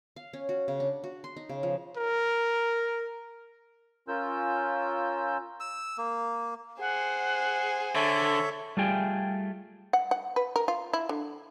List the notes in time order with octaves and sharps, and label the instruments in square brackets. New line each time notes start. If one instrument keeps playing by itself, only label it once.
[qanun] F5
C#4
F#4
C#3
D4
F#4
C6
D#4
C#3
F3
[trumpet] A#4
[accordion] C#4 F4 A#4 E6 G6
[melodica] E6
A#3
[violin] G#4 C5 [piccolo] F#5
[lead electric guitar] D3 [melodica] A4 C#5 E5
[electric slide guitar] G3 A3 F4 G#4 G5
[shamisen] F#5
F#5
B4
A#4
F4
E4
D3